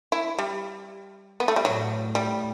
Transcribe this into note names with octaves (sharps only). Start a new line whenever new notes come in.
E4
G3
B3
A3
G3
A2 F#3
G3